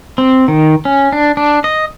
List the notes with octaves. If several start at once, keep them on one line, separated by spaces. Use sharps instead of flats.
C4
D#3
C#4
D4
D4
D#5